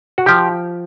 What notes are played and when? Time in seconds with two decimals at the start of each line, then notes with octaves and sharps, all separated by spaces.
0.18 F#4
0.26 F3 G4